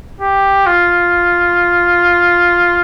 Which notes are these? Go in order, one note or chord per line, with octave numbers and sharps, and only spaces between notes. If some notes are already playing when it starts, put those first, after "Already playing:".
G4
F4